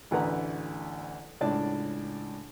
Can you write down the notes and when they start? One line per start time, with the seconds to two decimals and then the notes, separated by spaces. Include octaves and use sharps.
0.11 A1 D2 E3 B4 F#5 A#5
1.41 C#2 A2 D4 D5 A5